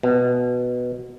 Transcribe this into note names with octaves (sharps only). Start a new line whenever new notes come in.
B2